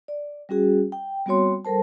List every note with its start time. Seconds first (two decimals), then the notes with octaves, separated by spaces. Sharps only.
0.08 D5
0.49 G3 C#4 F#4 G#4
0.92 G5
1.26 G3 B3 C4 F#4 C#5 C6
1.65 G3 A4 A#4 C5 A5